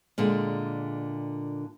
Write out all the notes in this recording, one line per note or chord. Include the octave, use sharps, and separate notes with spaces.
A#2 D3 G#3